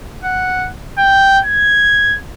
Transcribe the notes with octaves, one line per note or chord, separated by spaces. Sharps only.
F#5
G5
G#6